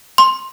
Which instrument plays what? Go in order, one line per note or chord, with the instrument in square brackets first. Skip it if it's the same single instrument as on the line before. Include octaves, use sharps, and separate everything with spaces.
[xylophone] C6